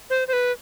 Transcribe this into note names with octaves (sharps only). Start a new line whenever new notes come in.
C5
C5
B4